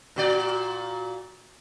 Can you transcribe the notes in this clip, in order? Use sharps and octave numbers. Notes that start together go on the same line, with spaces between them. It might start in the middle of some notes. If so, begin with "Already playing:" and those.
A#2 F#4 D5